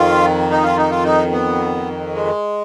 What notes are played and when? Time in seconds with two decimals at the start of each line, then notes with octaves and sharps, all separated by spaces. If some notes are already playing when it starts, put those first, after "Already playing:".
Already playing: F2 D#3 F4
0.51 D#4
0.63 F4
0.77 D#4
0.90 F4
1.04 D#4
1.32 B3
2.14 G#3